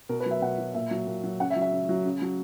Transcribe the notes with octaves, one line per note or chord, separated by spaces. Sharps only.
B2 A#4
B4
F#3 E5
B2 F#5
F#3
A#2 E5
F#3
A#2
F#3
C#3 F#5
E5
F#3
E5
C#3
F#3
C#3
F#3